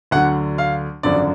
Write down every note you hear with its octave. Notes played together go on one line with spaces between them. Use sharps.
D2 D3 F#3 F#5
F5
G#1 F#2 D3 F3 D5